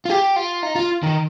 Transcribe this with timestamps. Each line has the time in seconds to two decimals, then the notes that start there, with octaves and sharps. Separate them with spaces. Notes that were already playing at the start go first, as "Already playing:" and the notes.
0.05 F4
0.10 G4
0.36 F4
0.63 D#4
0.75 F4
1.03 D#3